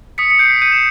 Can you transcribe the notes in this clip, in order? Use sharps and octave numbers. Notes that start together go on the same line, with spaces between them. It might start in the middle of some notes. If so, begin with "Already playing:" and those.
D#6 B6 C#7
C#7
G6 C7 D7
G6 C#7 D#7
E7